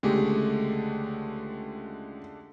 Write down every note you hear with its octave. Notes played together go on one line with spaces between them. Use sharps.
C#2 D3 G#3 A3 G4